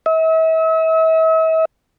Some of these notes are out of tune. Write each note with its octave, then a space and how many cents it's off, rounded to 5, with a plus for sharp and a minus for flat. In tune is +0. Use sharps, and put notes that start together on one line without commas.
E5 -40